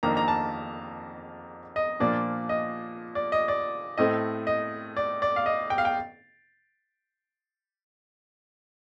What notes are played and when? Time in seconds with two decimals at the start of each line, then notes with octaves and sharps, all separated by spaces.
0.03 F2 D#3 A#3 D4 A#5
0.17 A#5
0.28 A5
1.76 D#5
2.00 A#2 F3 A#3 D4 D5
2.49 D#5
3.15 D5
3.32 D#5
3.48 D5
3.98 A2 A3 C4 D#5
4.47 D#5
4.97 D5
5.22 D5
5.36 F5
5.46 D#5
5.70 G5
5.78 F5
5.85 G5